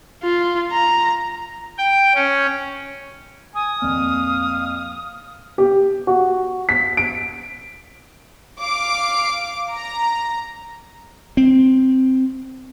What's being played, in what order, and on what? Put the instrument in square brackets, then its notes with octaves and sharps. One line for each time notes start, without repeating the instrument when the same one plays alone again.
[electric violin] F4
A#5
[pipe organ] G5
C#4
[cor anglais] G#5 [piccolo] D#6
[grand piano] F2 A#2 [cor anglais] F5
[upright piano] G4
F#4
B6
D7
[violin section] F5 D6
A#5
[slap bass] C4